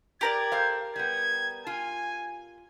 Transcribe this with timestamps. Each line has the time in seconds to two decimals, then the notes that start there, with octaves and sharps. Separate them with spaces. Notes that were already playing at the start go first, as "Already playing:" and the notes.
0.21 G4 A#4 D5 G#6
0.52 A4 C5 F5
0.96 G3 B3 G#6
1.67 F4 G#5